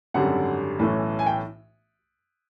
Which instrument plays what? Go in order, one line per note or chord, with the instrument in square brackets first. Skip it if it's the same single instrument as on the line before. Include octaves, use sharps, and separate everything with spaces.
[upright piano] G#1 F#2 D3 G3 F#5
B1 A2 E3 A3 C#4
G#5
G5